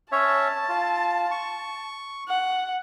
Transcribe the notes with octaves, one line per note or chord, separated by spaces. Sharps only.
C#4 C#5 E5 A5
F4
C#6
F#5